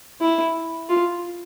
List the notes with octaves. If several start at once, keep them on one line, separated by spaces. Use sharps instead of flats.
E4
F4